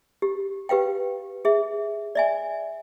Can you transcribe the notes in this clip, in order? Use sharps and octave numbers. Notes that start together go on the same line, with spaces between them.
G4
G4 B4 F5 G5
G#4 E5
D5 E5 G#5